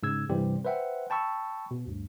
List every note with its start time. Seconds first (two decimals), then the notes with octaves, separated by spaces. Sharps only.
0.03 G#2 C#3 E6 G#6
0.29 G2 C3 E3 G3 C4 G4
0.65 B4 C5 E5 F#5 G5
1.10 G5 A5 B5 C#6 E6
1.71 B2
1.87 D2 G2